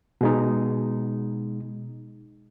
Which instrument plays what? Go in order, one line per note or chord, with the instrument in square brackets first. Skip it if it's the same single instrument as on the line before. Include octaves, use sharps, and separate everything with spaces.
[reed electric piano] B2 G#3 D#4